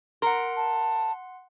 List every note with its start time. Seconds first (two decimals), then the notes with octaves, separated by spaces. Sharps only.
0.22 A#4 F#5 C6
0.57 A5